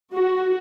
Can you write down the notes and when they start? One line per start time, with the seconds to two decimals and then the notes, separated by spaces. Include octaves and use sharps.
0.14 F#4